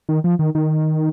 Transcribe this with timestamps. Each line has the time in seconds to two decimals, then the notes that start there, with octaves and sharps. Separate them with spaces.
0.09 D#3
0.24 F3
0.39 D#3
0.55 D#3